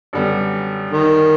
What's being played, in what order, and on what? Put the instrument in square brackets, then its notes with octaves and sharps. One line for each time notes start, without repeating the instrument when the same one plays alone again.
[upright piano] F#2 D3 G3 B3
[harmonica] D#3